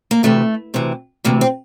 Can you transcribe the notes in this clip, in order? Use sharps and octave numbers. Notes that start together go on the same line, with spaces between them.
A#3
D2 C3 E3 A3
D2 C3 E3
D2 C3 E3 A#3
C4